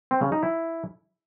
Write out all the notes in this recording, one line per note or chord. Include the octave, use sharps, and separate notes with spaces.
C4
C#3
D#4
E4